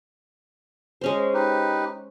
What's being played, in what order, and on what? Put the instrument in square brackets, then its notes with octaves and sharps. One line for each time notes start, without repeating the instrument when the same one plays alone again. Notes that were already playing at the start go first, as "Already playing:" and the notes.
[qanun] G#3 C#4 C5
[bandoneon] D#4 G4 B4